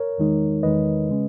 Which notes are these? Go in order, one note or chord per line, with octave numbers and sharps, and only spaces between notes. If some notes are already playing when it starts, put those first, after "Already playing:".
Already playing: A#4 C#5
E2 D#3 G#3 D#4
E2 D#3 G#3 D#4 B4 D#5
C#3 G#3 C#4